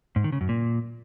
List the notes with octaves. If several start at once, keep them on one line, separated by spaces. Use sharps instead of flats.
G#2
D#3
C#3
F#2
A#2